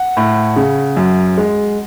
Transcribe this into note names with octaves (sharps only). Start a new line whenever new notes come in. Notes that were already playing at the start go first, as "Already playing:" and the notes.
Already playing: F#5
A2
C#3
F#2
G#3